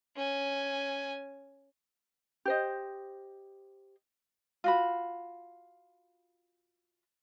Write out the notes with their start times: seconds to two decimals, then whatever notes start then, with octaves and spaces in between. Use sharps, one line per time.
0.16 C#4 G#5
2.45 G4 C5 D#5
4.64 F4 F#4 B5